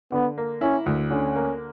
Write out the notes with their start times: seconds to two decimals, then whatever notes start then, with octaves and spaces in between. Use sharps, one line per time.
0.12 D3 B3
0.38 A#3
0.61 C#4 E4
0.86 D2
1.11 D3 C#4
1.36 A#3